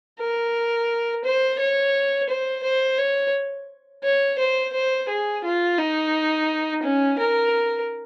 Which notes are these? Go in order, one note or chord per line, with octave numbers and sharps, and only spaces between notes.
A#4
C5
C#5
C5
C5
C#5
C#5
C5
C5
G#4
F4
D#4
C#4
A#4